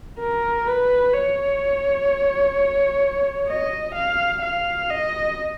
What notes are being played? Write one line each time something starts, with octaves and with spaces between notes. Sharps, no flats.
A#4
B4
C#5
D#5
F5
F5
D#5